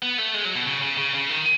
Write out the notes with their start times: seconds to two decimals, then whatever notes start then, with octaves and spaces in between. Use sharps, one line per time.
0.02 B3
0.18 A3
0.34 G#3
0.45 F#3
0.55 B2
0.65 C#3
0.82 C#3
0.98 C#3
1.14 C#3
1.29 D#3